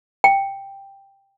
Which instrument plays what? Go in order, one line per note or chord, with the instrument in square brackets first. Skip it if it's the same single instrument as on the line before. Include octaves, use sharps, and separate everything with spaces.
[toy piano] G5